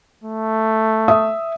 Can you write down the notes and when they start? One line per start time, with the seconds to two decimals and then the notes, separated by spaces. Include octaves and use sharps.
0.24 A3
1.08 E5 D#6